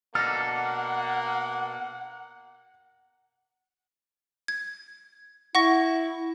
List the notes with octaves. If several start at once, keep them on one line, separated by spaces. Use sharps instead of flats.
B2 A#3 D4 A4 F#5 F6 A#6
G#6
E4 F#5 C#6 A#6